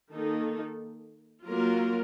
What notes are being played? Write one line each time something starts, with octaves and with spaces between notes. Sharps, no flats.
D#3 A#3 D#4 A4
F#3 A#3 F4 A#4